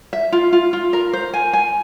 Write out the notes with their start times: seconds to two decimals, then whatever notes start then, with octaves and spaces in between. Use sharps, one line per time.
0.13 E5
0.32 F4
0.52 F4
0.73 F4
0.93 A#4
1.13 C5
1.34 G#5
1.53 G#5